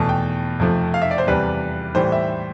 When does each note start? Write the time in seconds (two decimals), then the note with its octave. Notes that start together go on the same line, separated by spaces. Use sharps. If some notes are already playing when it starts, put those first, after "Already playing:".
Already playing: E2 B2 A3 A5
0.09 G5
0.59 F2 C3 F3 A3
0.94 F5
1.02 E5
1.11 D5
1.18 C5
1.27 E2 C3 G3 B4
1.95 A2 E3 G3 C5
2.12 E5